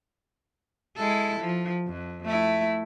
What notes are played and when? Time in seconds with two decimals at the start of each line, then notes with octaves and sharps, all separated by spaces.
0.96 G#3 E4 A4
1.40 F3
1.88 F2
2.25 A3 E4